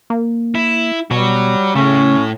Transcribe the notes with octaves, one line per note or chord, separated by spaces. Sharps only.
A#3
E4
B2 G3 F#4 C#5
A2 C#3 A3 C#4